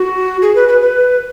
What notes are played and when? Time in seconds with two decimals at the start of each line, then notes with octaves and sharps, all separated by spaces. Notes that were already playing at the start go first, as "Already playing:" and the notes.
Already playing: F#4
0.42 G#4
0.55 B4
0.68 B4
0.81 B4